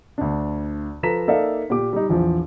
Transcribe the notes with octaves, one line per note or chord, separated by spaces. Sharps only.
D2 D4
F3 A4 B4 A#5 B6 E7
A#3 D#4 A4 D5 E5 F5
A#2 G4 D6
G3 D#4
A#1 E2 F3